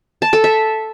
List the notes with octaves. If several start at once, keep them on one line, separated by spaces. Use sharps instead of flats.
A5
A4
E5